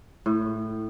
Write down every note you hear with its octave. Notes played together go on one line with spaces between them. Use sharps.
A2